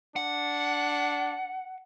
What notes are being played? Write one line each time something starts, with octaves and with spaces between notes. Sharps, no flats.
D4 F#5